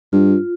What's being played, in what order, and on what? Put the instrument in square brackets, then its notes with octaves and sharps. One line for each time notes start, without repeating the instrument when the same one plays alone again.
[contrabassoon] G2 [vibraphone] F4